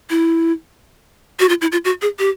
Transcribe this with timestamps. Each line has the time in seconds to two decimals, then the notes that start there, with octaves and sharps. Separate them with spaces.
0.10 E4
1.40 F#4
1.49 F4
1.61 E4
1.72 F4
1.85 F#4
2.02 G#4
2.19 G4